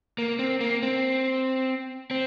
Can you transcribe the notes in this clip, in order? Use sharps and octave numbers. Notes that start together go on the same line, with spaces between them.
A#3
C4
A#3
C4
C4